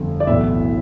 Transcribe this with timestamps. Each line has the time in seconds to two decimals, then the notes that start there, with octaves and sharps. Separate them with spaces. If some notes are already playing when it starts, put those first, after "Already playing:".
Already playing: G1 F2 D3
0.20 D5
0.27 B1 A2 E3 B3 E5